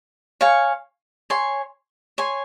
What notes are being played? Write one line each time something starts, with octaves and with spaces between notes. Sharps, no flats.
C#5 F5 G#5 C#6
C#5 G#5 C6
C#5 G#5 C6